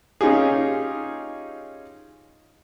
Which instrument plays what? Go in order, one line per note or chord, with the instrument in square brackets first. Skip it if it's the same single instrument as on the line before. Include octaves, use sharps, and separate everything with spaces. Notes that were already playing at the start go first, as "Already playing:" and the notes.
[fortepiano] C#4 D#4 F4 G4 G#4